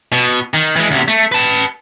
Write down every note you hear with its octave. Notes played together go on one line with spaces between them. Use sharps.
B2
D#3
E3 G#3
D2 C3
A3
B4 A5